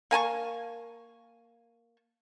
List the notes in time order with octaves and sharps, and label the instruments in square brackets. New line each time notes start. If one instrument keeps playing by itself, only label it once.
[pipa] A#3 G#5 A5 C#6